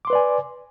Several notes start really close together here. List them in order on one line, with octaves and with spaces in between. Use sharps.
D6 C6 B4 D5 G#5